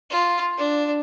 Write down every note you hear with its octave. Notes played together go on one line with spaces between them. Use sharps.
F4
D4